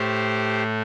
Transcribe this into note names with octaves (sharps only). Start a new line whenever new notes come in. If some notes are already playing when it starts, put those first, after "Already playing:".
Already playing: A2 A3 G4 C5